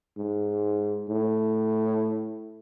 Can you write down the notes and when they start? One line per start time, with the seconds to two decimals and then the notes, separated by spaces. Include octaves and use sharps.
0.17 G#2
1.09 A2